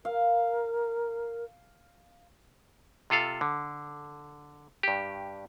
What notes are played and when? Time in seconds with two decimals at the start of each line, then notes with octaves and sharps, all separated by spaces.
0.05 A#4 F5
3.10 C3 F4 A4 F5
3.41 D3
4.83 G2 G4